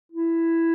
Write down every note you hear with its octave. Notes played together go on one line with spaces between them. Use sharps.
E4